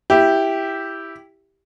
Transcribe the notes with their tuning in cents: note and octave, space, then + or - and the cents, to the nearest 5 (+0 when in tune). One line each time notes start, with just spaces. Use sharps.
E4 +0 G4 +0